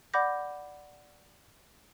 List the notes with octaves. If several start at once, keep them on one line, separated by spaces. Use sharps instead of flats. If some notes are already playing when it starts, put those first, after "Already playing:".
D5 F#5 B5 D6 G6 A#6